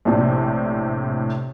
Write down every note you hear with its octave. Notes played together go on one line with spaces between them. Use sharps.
A#1 A2 C3